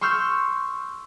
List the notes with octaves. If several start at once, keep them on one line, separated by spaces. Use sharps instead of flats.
C6 C#6 E6 F6 G6